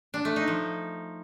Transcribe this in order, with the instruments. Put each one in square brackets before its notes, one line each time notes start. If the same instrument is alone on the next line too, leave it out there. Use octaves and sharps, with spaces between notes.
[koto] D4
A3
D#4
F3